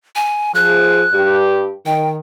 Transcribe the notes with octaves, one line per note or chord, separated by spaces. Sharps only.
G#5
F3 G#4 F#6
G2 G4
D#3 G5